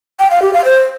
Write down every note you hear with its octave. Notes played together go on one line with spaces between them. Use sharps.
G5
F5
G4
F5
C5